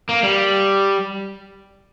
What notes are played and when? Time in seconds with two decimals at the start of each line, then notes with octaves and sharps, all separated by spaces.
0.09 A#3
0.23 G3